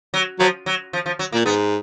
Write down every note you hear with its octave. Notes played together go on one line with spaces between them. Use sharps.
F#3
F3 F#3
F#3
F3
F3
F#3
A#2 A#3
G#2 B3